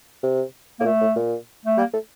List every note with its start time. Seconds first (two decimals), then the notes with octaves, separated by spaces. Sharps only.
0.23 C3
0.80 A2 A#3
0.84 A#2 A3
1.00 A2
1.16 A#2
1.65 A3
1.77 G3 A#3
1.93 A3